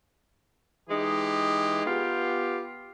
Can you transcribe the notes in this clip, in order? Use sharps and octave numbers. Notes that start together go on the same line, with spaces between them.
E3 G#3 D#4 G4
B3 F4 G4